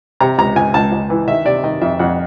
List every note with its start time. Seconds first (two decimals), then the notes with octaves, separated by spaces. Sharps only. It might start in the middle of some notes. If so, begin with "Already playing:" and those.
0.21 C3 A#5
0.38 C#2 A#5
0.56 C#2 G#5
0.74 C#2 A5
0.92 C#2
1.10 E3
1.28 D#3 E5
1.45 C3 D5
1.64 D#3 D#5
1.82 F2 E5
1.99 F2 F#5